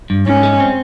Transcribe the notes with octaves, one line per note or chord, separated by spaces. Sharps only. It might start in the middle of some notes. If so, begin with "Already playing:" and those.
G2
G#2 C#4
G#3
C4